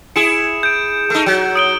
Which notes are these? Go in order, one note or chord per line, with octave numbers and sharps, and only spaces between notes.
E4 G#4 C#7 E7
G6 D7
A3 D#4
F#3
D#6 D7 G7